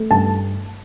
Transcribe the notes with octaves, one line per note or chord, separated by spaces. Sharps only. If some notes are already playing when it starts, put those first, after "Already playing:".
Already playing: A3
G2 A5